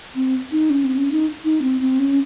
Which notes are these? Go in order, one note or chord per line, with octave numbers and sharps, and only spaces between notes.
C4
D#4
C#4
C4
C#4
D#4
D#4
C4
C4
C#4